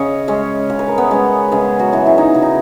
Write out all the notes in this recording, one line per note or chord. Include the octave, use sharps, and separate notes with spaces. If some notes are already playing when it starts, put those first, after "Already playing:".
Already playing: C#3 C#4 C#5 D#5
G#3 C#4
C#3 C#5
B4
A#4
B3 B4
G#3 C#4
C#3 G#3 G#4
F#3 F#4
E3 G#3
E4
D#4
C#3
D#4